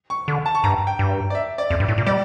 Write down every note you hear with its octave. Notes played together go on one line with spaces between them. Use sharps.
C#6
D3
A5
C#6
G2 A#5
G5
G2
D5
E5
D5
F2
G2
A2
A#2
G3 D5